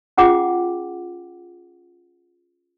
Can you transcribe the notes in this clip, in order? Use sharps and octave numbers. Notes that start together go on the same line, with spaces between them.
C#4 F4 G#4 F#5 G5 D6